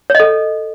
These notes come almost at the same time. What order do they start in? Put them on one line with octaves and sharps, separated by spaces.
C#5 D#5 A4